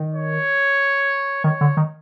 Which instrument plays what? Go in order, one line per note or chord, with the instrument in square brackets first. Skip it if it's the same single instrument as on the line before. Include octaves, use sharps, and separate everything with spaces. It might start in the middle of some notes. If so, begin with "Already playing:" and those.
Already playing: [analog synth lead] D#3
[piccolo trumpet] C#5
[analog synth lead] D#3 [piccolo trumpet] C#5
[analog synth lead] D3
D#3